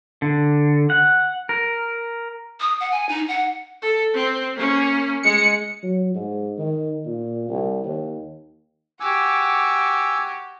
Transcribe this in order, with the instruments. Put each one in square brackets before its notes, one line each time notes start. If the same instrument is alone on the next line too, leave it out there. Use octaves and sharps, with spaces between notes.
[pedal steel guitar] D3
F#5
A#4
[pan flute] D#6
F#5
G#5
D#4
F#5
[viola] A4
C4
A#3 C#4
[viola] G#3 [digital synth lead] C#7
[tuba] F#3
G#2
D#3
A#2
C2
D#2
[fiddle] F#4 G4 [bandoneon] G#5 D6 E6